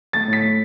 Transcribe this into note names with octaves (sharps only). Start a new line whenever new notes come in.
A3 A6
A2
B6
A3